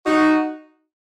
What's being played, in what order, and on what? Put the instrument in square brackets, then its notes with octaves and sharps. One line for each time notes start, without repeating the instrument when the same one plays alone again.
[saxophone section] D#4 F#4